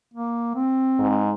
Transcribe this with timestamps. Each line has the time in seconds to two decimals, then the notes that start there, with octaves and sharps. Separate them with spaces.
0.14 A#3
0.56 C4
0.99 G#2